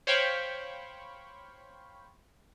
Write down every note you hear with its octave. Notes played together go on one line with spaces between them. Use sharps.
C5 C#5 F5 G5 B5 C#6